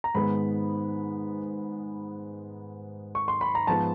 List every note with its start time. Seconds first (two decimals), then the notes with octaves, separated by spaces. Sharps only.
0.04 A#5
0.14 G#2 D#3 G#3 B3 B5
3.15 C#6
3.28 C6
3.41 B5
3.55 A#5
3.67 G#2 F3 G#3 B3 A5